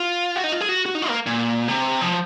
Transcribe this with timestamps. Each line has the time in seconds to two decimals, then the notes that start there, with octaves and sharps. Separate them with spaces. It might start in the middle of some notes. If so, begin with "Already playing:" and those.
Already playing: F4
0.36 F#4
0.44 D#4
0.52 F4
0.61 G#4
0.69 F#4
0.86 F#4
0.95 D#4
1.02 F4
1.09 A#3
1.26 A#2
1.68 C3
2.01 F3